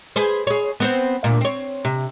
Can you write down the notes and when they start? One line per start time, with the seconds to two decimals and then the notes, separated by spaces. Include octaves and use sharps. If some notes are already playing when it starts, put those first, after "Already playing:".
0.16 G#4 B4 C5
0.47 G#4 C#5
0.80 B3 C4 C5
1.24 D2 A#2
1.41 C4 C#5
1.85 C3